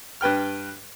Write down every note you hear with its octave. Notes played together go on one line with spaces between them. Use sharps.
G2 B4 G5 F6